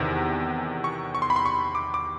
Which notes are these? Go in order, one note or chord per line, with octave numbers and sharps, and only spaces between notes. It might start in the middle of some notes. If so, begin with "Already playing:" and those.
Already playing: E2 C3 D#3
C#6
C#6
C6
B5
C6
C#6
D6
D6